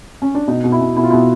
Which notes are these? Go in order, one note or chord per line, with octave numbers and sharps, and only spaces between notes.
C#4
D4
B2 D#4
B2
E4
B2
B2 E4
F4
B2 E4